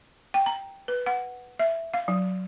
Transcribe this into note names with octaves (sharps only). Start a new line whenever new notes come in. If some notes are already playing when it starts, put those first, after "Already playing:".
G5
A#5
B4
F#5
E5
F5
F#3